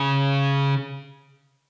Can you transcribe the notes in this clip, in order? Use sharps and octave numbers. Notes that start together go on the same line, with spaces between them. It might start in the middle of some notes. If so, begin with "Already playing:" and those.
Already playing: C#3